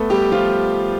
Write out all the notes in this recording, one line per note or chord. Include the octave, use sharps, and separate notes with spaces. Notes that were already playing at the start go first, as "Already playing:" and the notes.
Already playing: A3 B3 A4 B4
G3 G4
F3 F4